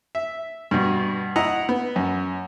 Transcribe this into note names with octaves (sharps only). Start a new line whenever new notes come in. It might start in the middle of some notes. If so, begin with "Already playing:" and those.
E5
G2 B2
E4 D#5 F#5 A#5
B3
F#2